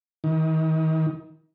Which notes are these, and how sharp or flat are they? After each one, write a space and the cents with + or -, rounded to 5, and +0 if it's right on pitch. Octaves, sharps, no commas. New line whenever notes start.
D#3 +35